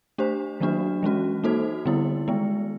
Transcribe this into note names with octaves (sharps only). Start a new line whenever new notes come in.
A3 D4 G4 C5
D#3 F#3 A#3 D4 F#4
E3 G#3 C#4 F#4
A#3 D#4 F#4 A4 C5
D3 G3 B3 E4
D#3 G#3 B3